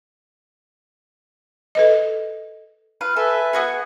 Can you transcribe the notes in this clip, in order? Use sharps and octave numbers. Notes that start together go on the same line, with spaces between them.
A4 B4 D#5
F4 B4 F5
A4 B4 E5 G#5
B3 F#4 G#4